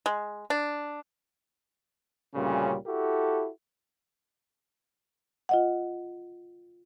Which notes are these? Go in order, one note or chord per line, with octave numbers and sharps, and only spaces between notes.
G#3
D4
D2 A#2 C#3 G3 C#4
E4 F#4 G4 A4
F4 D#5 F#5